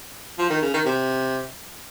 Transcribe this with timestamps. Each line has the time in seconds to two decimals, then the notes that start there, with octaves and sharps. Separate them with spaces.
0.39 F3
0.50 D#3
0.62 C#3
0.74 D#3
0.85 C3